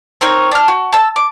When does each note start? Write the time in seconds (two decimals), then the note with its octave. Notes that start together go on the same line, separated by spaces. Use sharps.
0.21 C4 D#4 A#4 C#5
0.51 D4 F6
0.68 F#4
0.93 A5 E6
1.16 D6